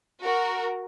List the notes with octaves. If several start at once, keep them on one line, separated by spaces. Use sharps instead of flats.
F#4 A#4